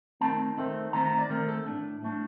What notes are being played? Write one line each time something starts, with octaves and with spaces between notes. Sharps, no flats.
D#3 A3 C4 A5
D#3 A3 C4
D#3 A3 C4 A#5
A#5
D5
D#3 A3 C4 A#4
A4
A2 A3 D4
A2 A3 D4